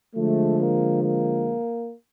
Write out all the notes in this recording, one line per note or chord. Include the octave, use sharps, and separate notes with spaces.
D3 F3 G#3 A3
A#3
A#3